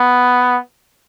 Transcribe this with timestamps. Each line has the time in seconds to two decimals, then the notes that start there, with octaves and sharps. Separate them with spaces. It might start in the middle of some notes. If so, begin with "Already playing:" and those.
Already playing: B3